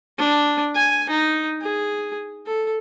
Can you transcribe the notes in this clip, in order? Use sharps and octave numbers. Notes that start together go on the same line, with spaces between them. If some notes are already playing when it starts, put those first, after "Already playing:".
D4
G#5
D#4
G#4
A4